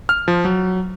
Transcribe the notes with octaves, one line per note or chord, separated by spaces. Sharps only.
F6
F3
F#3